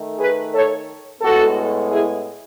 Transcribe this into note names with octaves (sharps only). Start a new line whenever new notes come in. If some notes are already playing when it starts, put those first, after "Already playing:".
Already playing: D#3 A3
G#4 B4
A4 C#5
A2 G#3 B3 F#4 A4
E4 G#4